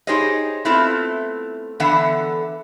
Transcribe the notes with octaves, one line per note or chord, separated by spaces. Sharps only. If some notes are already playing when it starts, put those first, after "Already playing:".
D#4 G4 G#4 C5 C#5 D#5
A3 B3 C4 E4 F4
D3 E3 B3 E5 F#5